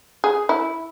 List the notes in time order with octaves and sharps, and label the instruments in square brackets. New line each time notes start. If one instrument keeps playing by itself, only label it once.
[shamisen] G#4
E4